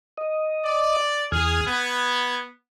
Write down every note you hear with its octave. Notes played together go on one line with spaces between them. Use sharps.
D#5
D5
E2 G#4 F6 G#6
B3 G#6